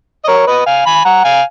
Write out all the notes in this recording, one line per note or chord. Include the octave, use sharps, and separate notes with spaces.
D#5
A#4 C#5
B4 D#5
F5 G#5
G#5 B5
F#5 A#5
F5 G#5